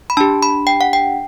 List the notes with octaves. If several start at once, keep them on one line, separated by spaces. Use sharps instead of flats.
B5
D4 G4 A5
B5
G5
F#5
G5